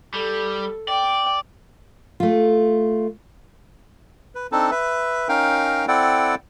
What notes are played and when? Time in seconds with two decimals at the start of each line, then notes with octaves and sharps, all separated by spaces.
0.14 G3 A4
0.88 D5 G5
2.20 A3 F4
4.35 B4
4.52 C4 D4 D#4 A4
4.71 B4 E5
5.29 C#4 D#4 A#4 F5 G5
5.88 C4 E4 A4 D5 F#5 G5